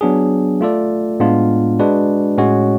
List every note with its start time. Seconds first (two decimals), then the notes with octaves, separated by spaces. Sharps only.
0.01 F#3 B3 D4 G#4
0.61 A3 F4 A4 D5
1.20 A2 G#3 B3 D4 F4
1.79 G#3 D4 F#4 B4 D5
2.38 A2 G#3 C#4 F#4 C#5